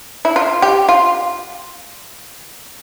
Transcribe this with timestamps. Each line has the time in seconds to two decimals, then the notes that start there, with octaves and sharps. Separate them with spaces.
0.25 E4
0.36 F4
0.62 G4
0.89 F4